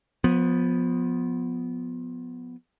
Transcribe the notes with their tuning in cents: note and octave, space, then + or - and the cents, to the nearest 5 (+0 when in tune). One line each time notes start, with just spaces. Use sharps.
F3 +25 B3 +0